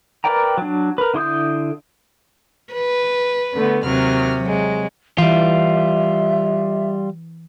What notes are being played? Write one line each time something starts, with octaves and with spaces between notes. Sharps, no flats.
A#4 B4 D5 G5 A#5
F#3 D4
A#4 B4
D3 E4 C6 D#6 G6
B4
D3 A3 B3
D#2 C3 F#3 F6
F#3 G#3
E3 G3 F4 E5